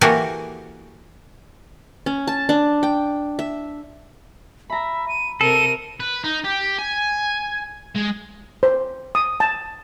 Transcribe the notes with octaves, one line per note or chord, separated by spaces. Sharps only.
E3 A#3 F#4 G4 A4 A#4
C#4
A5
D4
G5
E5
E5 A#5 B5
D#7
C3 A4 A#4 D#7
B4
D#4
G4
G#5
G#3
C5
D#6
A5